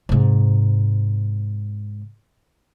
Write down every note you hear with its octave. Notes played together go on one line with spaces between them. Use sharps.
G#2 C3